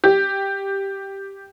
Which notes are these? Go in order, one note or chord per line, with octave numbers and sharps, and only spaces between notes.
G4